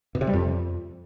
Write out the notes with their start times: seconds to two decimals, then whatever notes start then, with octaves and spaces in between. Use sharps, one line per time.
0.15 B2
0.21 C3
0.27 G3
0.33 F2